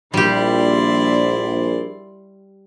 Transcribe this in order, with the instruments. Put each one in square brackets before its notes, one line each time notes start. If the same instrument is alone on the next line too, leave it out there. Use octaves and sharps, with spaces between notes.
[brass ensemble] A#1 [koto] G3 G4 [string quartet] E4 D5 C6